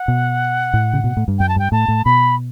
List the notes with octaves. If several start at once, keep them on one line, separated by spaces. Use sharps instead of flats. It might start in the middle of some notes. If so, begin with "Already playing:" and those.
Already playing: F#5
B2
A2
C#3
B2
A2
G2
F#2 G5
A5
G2 G5
A2 A5
A2
B2 B5